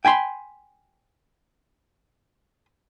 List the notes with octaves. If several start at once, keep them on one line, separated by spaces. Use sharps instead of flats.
G5 G#5 B5 C6